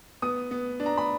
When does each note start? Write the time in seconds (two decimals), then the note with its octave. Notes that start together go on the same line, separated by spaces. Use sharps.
0.22 B3 D#6
0.51 B3
0.80 D4
0.86 A#5
0.98 B5